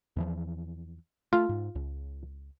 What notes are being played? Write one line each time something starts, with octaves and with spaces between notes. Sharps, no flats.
E2 E3 F3
A3 F4
G#2
C#2